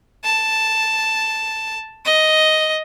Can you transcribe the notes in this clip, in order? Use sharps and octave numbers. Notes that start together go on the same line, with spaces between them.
A5
D#5